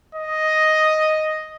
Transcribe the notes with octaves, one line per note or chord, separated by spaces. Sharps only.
D#5